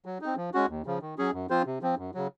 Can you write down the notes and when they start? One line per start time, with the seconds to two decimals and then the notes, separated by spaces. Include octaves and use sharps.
0.05 F#3
0.21 C4 D#4
0.37 F3
0.54 G#3 C#4 F#4
0.69 D#2
0.86 C#3 F3
1.02 D#3
1.18 F#3 C#4 G#4
1.34 F#2
1.50 F3 C4 F4 C5
1.66 C3
1.82 F3 C4
1.98 F#2
2.14 C#3 F#3